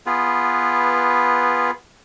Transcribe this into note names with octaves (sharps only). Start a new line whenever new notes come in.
B3 F4 G#4 B4